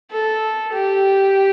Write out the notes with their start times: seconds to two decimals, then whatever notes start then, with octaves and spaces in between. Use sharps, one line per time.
0.11 A4
0.73 G4